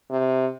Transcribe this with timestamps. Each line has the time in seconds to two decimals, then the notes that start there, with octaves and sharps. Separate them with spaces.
0.10 C3